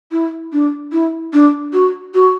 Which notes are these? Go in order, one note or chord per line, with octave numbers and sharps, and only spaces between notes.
E4
D4
E4
D4
F#4
F#4